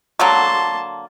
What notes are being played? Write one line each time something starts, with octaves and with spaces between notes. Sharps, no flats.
D3 F#3 A#3 A5 C6